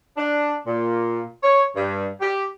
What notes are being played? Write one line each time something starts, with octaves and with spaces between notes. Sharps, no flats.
D4
A#2
C#5
G2
G4